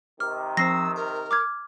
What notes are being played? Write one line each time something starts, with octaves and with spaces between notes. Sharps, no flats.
C3 D#3 D6 F6
F3 C4 C5 E6 A#6 C7
A#4 A#5
D6 F6 G#6